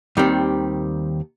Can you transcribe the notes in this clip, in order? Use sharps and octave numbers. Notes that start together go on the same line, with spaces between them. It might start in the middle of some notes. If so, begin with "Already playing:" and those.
D#2 D#3 G3 C4